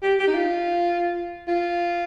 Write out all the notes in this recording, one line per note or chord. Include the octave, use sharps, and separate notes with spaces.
G4
G4
D#4
F4
F4